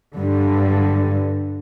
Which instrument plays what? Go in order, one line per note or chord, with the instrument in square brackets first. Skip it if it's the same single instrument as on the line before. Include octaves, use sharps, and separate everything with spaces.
[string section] G2 D3